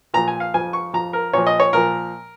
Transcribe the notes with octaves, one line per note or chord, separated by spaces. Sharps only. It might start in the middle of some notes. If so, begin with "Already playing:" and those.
A#2 F3 A#5
G#5
F5
F2 F3 G#5
C#6
F2 F3 A#5
A#4
A#2 F3 C#5
D#5
C#5
A#2 F3 A#4